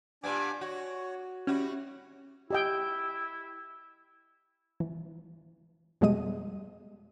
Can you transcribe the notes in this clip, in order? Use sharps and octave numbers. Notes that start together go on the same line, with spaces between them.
A#2 G3 B3 D4 G#5 D6
F#4 C#5
G3 C#4 E4 F#4 F#5
E4 G4 D#5 G5
E3
F2 B2 G3 G#3 D#5 D#7